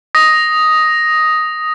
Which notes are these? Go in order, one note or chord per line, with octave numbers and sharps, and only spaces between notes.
D#6 A#6